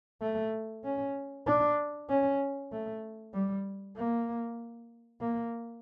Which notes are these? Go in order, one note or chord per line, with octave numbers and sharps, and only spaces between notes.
A3
C#4
D4
C#4
A3
G3
A#3
A#3